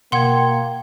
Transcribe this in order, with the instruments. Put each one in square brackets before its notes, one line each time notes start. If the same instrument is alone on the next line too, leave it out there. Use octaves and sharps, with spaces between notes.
[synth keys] B2 G#6 [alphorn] A#3 [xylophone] F#5 C6 [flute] G5